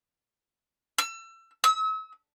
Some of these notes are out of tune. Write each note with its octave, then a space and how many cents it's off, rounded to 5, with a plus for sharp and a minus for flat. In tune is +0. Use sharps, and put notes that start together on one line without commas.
E6 +30
E6 -40